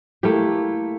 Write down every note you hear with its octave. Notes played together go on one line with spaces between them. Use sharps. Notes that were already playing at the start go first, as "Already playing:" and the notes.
A3 A#3 E4 G4